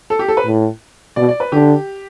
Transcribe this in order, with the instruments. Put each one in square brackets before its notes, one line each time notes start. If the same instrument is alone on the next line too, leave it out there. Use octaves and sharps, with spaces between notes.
[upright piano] A4
G4
A4
B4
[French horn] A2
[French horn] B2 [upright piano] D5
[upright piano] D5
B4
[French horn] D3 [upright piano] G4